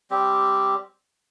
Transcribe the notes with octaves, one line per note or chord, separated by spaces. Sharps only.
G3 C4 G4